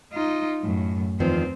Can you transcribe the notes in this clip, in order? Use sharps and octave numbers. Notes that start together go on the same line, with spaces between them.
D#4 F4
F#2 A2
E2 D#3 F3 C4